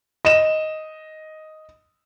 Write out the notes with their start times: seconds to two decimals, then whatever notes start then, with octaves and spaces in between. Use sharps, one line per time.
0.25 D#5 E7